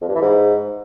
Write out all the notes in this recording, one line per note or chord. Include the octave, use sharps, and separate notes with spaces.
F2
G2
E3
G#2